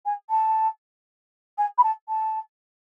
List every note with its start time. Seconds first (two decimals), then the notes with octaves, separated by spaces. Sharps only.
0.05 G#5
0.30 A5
1.58 G#5
1.78 B5
1.83 A5
2.08 A5